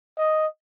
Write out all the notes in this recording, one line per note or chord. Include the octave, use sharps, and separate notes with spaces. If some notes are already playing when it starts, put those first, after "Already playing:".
D#5